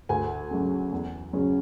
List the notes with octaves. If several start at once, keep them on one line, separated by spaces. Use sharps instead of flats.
D2 G#5
C#3 F#3
E2
C#3 F#3 C#4